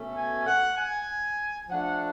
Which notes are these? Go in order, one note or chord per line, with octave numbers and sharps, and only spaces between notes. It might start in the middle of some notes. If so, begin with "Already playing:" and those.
Already playing: B2 A3 C#4
G#5
F#5
G#5
F3 A3 D4 F#5